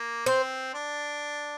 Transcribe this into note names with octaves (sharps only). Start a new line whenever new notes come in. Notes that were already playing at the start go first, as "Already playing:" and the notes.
Already playing: A#3
C4 C5
D4